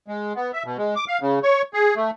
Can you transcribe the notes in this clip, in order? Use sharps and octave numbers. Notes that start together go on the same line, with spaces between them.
G#3
B3
E5
B2
G#3
D6
F5
C#3
C#5
G#4
A3